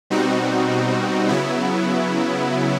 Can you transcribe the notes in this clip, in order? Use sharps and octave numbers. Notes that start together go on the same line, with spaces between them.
B2 G3 C4 D#4 F#4
C#3 F#3 B3 E4